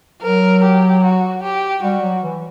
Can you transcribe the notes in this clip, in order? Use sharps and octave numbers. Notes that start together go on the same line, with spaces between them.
F#3 A#4
G4
F#4
G4
G3 F#4
F#3
E3